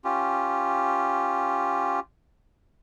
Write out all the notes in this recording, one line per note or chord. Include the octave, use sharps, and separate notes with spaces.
C#4 F4 G4